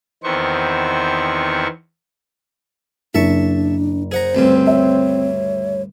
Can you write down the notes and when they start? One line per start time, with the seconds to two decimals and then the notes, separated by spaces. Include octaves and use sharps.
0.23 E2 D#3 B3 C4 C5 C#6
3.14 F#1 D4 E5 A5 C#6
4.12 G#4 C5 F#5 A#5
4.35 D2 G2 C#3 C4
4.67 C#5 E5